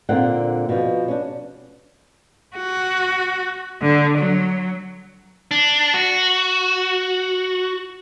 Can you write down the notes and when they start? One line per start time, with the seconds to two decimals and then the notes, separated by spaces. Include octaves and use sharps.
0.09 A#2 D3 C4 F5 F#5
0.69 B2 F3
1.08 C#4 D4
2.56 F#4
3.81 D3
4.18 F#3
5.51 D4
5.94 F#4